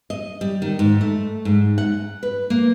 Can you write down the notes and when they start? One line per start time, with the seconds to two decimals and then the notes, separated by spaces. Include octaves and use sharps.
0.10 D#5
0.41 G3
0.62 D#3
0.79 G#2
1.01 A3
1.45 G#2
1.78 F#5
2.23 B4
2.50 A#3